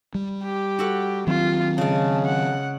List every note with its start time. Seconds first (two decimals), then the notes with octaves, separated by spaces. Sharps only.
0.15 G3
0.44 G4
0.79 F#4 A4 F#5
1.27 D#3 F#3 C4 F4
1.78 C#3 G#3 A5
2.25 F#5